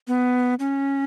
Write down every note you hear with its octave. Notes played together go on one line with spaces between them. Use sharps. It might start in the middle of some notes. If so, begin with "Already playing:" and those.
B3
C#4